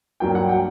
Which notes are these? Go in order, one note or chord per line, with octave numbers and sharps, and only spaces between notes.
G2 F#3 A#3 G5
F#5
G5